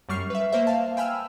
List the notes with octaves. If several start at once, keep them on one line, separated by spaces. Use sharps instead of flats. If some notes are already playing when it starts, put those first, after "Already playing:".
F#2 G3 C#6 F6 C7
B4 E5
A#3 C5 E5
F5 A5
G5 G#5 B5 E6 F6